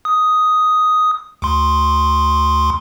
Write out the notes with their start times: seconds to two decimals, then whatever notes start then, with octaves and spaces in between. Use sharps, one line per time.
0.05 D#6
1.42 D2 C6